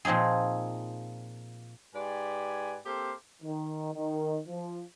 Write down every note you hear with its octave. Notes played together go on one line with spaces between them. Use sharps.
A#2 F3 C4 D#4 G#4
G#2 G4 B4 D5 G#5
A#3 C4 G4 A4 C5
D#3
D#3
F3